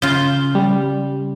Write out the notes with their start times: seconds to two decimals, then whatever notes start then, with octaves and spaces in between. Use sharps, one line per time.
0.02 C#3 F4 G6
0.55 G3